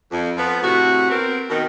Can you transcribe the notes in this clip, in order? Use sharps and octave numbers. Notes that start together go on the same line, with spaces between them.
F2
F3 B3
A2 C3 F#4
B3 C4 A#4
B2 D#3